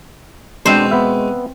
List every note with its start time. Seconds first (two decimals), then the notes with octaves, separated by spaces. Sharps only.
0.66 B2 G#3 C4 D4 C5
0.91 B3 B4 E5